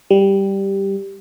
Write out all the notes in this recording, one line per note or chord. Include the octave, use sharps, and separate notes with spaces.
G3